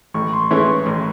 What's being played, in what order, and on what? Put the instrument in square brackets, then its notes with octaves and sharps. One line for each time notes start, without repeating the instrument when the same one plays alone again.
[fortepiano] A1 [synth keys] C#6
[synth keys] C6
[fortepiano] G#2 E3 A3 C#4 [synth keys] C6
[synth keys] C#6
[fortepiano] A1